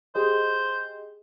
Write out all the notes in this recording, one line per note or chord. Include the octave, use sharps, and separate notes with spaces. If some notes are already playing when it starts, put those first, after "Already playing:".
G4 G#4 C5 D#5